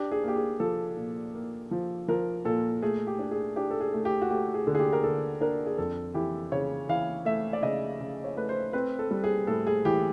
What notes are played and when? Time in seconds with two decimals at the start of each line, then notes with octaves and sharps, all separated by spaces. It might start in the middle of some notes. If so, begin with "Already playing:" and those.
Already playing: D4 G4
0.12 G#4
0.23 A#3 G4
0.36 G#4
0.60 F3 A4
0.97 A#2
1.34 A#3
1.71 F3
2.08 F3 A#4
2.45 A#2 A4
2.82 A3 G#4
3.07 G4
3.19 D4
3.31 G#4
3.56 D4 G4
3.71 A4
3.81 G#4
3.93 A3
4.05 G4
4.21 F#4
4.30 A3 G4
4.54 G#4
4.67 D3
4.75 G#4
4.79 G4
4.93 A#4
5.03 D3 A4
5.41 D4 A#4
5.66 G#4
5.78 F2 A4
6.14 E3 G4
6.52 C#3 C#5
6.89 E3 F5
7.25 A3 E5
7.53 D5
7.62 C#3 D#5
8.00 C#3
8.24 C#5
8.36 A3 B4
8.49 C5
8.73 C4 B4
8.99 A4
9.11 G3
9.24 G#4
9.47 A2 A4
9.67 G#4
9.85 E3 G4